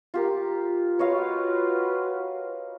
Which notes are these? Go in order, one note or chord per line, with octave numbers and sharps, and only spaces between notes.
F4 G4 A#4
F4 F#4 B4 C#5 D#5 F5